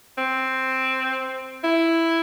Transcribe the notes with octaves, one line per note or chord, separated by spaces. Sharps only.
C4
E4